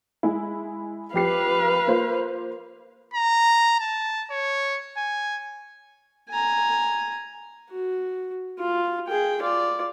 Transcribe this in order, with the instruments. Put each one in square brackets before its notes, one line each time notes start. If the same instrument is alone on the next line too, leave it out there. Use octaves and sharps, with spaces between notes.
[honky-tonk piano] G#3 E4
[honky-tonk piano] F2 G4 C7 [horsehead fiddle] B4 F5
[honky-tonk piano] A#3 F4 C5
[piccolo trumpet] A#5
A5
C#5
G#5
[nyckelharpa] G#5 A#5
F#4
F4
G#4 G5
F4 D5